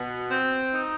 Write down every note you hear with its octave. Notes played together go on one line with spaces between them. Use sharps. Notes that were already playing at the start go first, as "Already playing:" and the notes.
Already playing: B2
C4
D#4